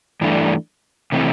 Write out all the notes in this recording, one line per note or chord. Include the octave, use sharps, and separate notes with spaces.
G2 E3 A3 D4
C3 E3 A3 C4